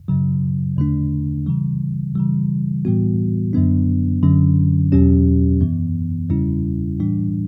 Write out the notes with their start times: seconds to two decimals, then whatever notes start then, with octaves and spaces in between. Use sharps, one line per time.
0.08 F#2 C#3 F#3
0.77 E2 D3 A3 D4
1.46 C#3 E3 G3
2.16 C#3 E3 G3
2.85 A2 E3 G3 B3 F#4
3.53 F#2 D3 F#3 B3 D4
4.23 F#2 D3 F#3 C#4
4.92 E2 B2 F#3 C#4 G4
5.61 F#2 E3 B3
6.30 E2 C#3 G3 C#4 E4
7.00 A2 E3 G3 D4